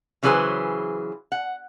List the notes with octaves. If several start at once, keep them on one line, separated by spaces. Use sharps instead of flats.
C#3 E3 F#3 G#4 B4 C5
F#5